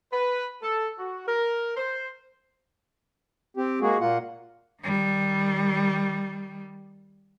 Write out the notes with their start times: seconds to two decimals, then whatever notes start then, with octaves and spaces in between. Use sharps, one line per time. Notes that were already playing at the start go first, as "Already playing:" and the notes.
0.12 B4
0.62 A4
0.98 F#4
1.27 A#4
1.77 C5
3.57 C4 G4
3.81 G#3 A#3 F#4 G#4
4.00 A#2 A#3 F4 F#5
4.81 D#3 G3